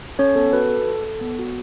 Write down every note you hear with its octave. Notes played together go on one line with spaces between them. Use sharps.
C#4 A4 C#5
B3 A4
F#4 B4
A4
A4
A4
B3
F#4